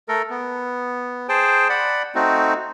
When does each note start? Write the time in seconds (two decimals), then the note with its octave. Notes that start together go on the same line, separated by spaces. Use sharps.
0.09 A3 A4 A#4
0.30 B3
1.29 G#4 C5 G5 A5
1.69 D5 F#5 B5
2.15 A3 C4 D#4 F#4